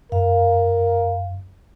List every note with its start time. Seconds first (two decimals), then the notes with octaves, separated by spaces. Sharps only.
0.12 F#2 A#4 F5